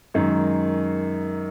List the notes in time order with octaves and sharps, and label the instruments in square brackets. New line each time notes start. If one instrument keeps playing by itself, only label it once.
[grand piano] F#2 D#3 G#3